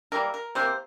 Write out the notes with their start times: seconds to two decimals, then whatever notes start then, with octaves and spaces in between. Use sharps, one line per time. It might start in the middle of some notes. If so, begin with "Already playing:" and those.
0.12 E3 G3 A#3 A#4
0.34 A#4
0.55 C3 E3 A#3 C5